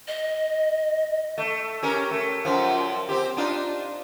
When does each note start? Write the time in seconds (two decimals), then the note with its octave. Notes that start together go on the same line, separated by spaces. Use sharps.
0.08 D#5
1.38 A3
1.83 C#4 G4 A#4
2.11 A3
2.45 F#2 F3
3.09 C4 G4
3.37 D4 D#4 F4